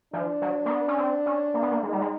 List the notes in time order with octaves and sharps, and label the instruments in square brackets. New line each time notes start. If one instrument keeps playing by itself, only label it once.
[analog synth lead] F3 [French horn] D4
[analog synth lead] F#3
A#3
B3
C#4
C4
C#4
A#3
B3
A#3
[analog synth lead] G#3 [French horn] D#4
[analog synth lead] G3
G#3